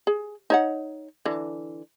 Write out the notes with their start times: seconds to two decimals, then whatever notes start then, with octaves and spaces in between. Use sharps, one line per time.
0.07 G#4
0.50 D#4 C#5 F#5
1.25 D3 E3